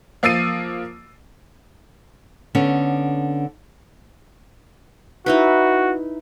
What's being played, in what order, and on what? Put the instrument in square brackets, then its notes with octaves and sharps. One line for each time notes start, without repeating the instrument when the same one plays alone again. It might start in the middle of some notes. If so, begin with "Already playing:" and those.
[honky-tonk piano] F3 A#3 E6 A6 C7 D#7
[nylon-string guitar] D3 B3 C#4
[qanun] D#4 E4 B4 [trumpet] F#4